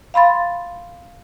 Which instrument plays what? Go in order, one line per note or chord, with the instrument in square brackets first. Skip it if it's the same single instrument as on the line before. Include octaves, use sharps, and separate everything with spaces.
[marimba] F5 B5 C6 A6